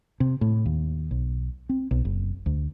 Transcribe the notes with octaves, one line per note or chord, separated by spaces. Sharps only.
C3
A2
D#2
B1
C4
B1
F#1
D2